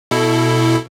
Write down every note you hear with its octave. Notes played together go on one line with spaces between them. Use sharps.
B2 E4 A4